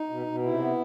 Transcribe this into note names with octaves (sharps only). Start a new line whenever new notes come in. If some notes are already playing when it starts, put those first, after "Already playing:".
Already playing: D#4
B2
B2
C3 E4
B3